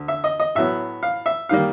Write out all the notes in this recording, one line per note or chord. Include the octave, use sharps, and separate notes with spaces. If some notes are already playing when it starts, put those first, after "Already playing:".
Already playing: D2
E5
D#5
D#5
A2 F#3 B3 E5
F5
E5
D#3 G3 A#3 F5